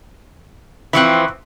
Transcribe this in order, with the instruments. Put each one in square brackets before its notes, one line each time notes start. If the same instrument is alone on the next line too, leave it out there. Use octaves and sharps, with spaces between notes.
[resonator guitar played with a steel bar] E3 F3 C4 [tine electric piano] B5 C#6 F#6